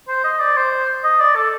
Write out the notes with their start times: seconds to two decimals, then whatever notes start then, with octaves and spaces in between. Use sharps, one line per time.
0.08 C5
0.24 D#5
0.40 D5
0.56 C5
1.04 D#5
1.20 D5
1.36 A4